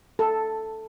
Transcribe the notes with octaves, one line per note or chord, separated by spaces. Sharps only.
A4